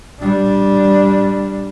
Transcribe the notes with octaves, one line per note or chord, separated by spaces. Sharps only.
G3 D4